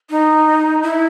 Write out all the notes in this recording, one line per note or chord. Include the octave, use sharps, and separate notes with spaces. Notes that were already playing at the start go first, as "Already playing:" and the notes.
D#4
E4